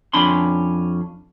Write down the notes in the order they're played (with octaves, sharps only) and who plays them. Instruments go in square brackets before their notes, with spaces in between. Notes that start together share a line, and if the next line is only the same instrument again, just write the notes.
[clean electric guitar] F2 C#4 D4 B5 C6